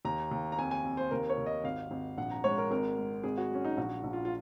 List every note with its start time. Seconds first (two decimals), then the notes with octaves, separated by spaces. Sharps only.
0.05 D#2 A#5
0.31 D#2
0.52 A#5
0.58 F2 G#5
0.71 G#5
0.84 F2
0.97 C5
1.11 D#2 A#4
1.30 C#5
1.38 D#2
1.46 D#5
1.64 G#1 F5
1.91 G#1
2.17 A#1 F#5
2.31 A#5
2.44 G#3 C#5
2.58 A#4
2.71 G#1 A#4
2.98 G#3
3.24 G#1 G#4
3.38 F#4
3.51 F#3 C#4
3.65 D#4
3.77 A#1 F#4
4.04 A#1
4.13 F4
4.25 F4